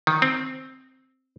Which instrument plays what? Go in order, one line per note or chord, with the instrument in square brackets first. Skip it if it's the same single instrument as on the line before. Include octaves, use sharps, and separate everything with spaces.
[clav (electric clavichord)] D#3
C4